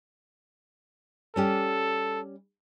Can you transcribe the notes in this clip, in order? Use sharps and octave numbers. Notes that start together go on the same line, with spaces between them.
G3 C#4 G4 A4